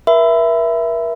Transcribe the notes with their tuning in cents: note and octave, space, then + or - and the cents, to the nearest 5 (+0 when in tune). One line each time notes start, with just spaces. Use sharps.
A#4 +40 E5 +5 B5 +30